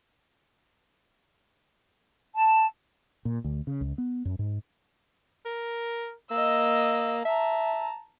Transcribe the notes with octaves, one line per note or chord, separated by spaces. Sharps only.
A5
A#2
D2
C#3
C#2
B3
F#2
G#2
A#4
A#3 D#5 E6
E5 A5 A#5